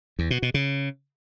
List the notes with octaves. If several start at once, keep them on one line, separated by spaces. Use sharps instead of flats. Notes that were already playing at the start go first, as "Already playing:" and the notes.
E2
B2
B2
C#3